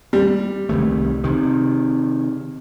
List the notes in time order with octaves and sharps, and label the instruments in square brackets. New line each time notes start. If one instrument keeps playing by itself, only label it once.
[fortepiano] G3
[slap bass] C2 D#3 A3
C3 D#3